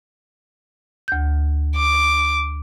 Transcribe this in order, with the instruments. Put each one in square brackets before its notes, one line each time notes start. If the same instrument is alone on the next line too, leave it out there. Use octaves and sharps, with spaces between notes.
[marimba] D2 G6
[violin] D6